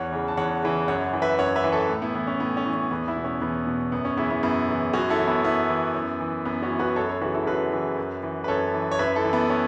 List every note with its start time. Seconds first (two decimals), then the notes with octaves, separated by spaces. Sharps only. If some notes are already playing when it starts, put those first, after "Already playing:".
Already playing: E2 C#5 F#5
0.12 C#3 E3
0.28 A5
0.37 E2 C#5 F#5
0.63 C#3 E3
0.88 F#2 C#5 F#5
1.13 E3
1.22 B4 E5
1.39 F#2 C#5 F#5
1.56 B4 E5
1.64 E3
1.72 A4 C#5
1.89 A2
2.02 B3 E4
2.15 E3 B3
2.27 C#4
2.40 A2 B3
2.57 C#4
2.65 E3
2.74 C#4
2.91 E2 B3
3.08 B3 E4
3.16 B2
3.24 C#4
3.41 E2 B3
3.67 B2
3.92 F#2 B3
4.05 C#4
4.17 C#3 E3 B3 E4
4.30 B3 E4
4.43 F#2 B3 E4
4.68 C#3 E3
4.93 F#2 C#4 F#4
5.10 E4 A4
5.19 E3
5.27 B3 E4
5.44 F#2 B3 E4
5.70 E3
5.95 F#2
6.20 E3
6.45 F#2 B3
6.62 C#4 F#4
6.71 E3
6.79 F#4 B4
6.96 F#2 A4 C#5
7.09 A4 C#5
7.21 C#3 E3 F#4 B4
7.34 E4 A4
7.47 F#2 F#4 B4
7.72 C#3 E3
7.97 F#2
8.23 E3
8.44 B4
8.48 F#2 A4 C#5
8.74 E3
8.91 C#5
8.99 F#2 B4 E5
9.16 E4 A4
9.25 E3
9.32 B3 E4
9.50 C#4